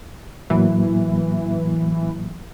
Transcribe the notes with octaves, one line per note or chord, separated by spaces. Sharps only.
A2 E3 F#3 A#3